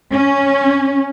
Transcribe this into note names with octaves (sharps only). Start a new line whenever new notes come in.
C#4